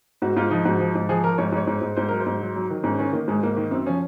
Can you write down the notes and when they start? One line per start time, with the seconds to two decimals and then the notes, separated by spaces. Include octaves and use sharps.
0.22 G#2 F#4
0.36 G#2 F4
0.51 F3 D#4
0.65 G#2 F#4
0.80 F3
0.95 G#2
1.09 F3 G#4
1.24 F3 A#4
1.38 G#2 C#5
1.52 G#2 C#5
1.67 G#2
1.82 G#2
1.96 G#2 C5
2.08 F#3 A#4
2.20 C5
2.26 G#2
2.41 F#3
2.56 F#3
2.70 D#3
2.84 G#2 C#4
2.99 D#3 C#4
3.13 D#3 A#3
3.28 G#2 G#3
3.43 G#2 A#3
3.57 D#3
3.71 F#2 C4
3.86 F3 C#4